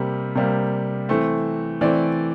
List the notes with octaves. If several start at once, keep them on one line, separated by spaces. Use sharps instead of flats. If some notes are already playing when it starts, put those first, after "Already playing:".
Already playing: C3 G3 A#3
C3 G3 A#3
E3 A3 C4
E3 A3 C4 D5